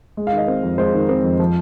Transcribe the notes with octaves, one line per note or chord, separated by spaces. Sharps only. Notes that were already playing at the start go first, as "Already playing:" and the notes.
G#3
F5
D#3
D#5
C4
F2
G#3 C5
D#3
C4
F2
F3